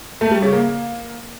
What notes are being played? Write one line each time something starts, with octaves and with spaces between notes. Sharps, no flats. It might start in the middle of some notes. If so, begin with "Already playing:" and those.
A3
G3
C#3
A#3